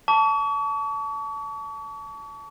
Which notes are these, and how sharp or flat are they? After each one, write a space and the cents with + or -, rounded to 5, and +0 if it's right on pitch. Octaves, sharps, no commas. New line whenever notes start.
A5 +0 C#6 +45